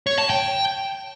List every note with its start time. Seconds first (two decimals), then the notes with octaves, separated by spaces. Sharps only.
0.07 C#5
0.18 A5
0.30 G5